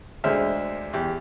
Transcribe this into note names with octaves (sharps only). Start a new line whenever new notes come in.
D2 D3 G#3 C5 E5 F6
E2 G4